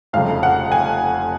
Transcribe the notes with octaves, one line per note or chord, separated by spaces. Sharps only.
F1 F2 C#3 F3 F5
F#5
G#5